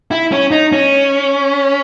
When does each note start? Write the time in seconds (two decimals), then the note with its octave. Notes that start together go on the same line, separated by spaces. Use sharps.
0.11 E4
0.32 C#4
0.51 D#4
0.72 C#4